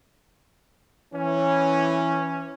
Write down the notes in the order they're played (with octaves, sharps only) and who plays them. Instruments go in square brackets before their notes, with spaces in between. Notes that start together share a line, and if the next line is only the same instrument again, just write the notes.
[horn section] E3 C#4